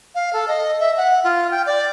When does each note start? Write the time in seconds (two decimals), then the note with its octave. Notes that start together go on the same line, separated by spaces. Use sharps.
0.15 F5
0.33 A4
0.48 D#5
0.80 E5
0.97 F#5
1.24 F4
1.51 G5
1.67 D5